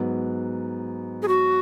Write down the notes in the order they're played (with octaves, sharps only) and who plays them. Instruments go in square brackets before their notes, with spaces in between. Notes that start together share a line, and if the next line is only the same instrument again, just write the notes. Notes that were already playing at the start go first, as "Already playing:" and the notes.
Already playing: [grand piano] G#2 F#3 B3
[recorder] G#4
F#4